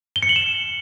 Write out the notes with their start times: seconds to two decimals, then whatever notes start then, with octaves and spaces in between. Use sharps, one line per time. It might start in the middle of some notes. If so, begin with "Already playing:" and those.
0.16 G7
0.23 C#7
0.29 F#7
0.36 E7